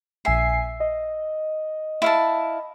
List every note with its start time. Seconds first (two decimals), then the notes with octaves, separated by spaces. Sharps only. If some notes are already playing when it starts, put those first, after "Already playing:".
0.25 A#1 E5 G#5 C7
0.80 D#5
2.02 E4 F5 A5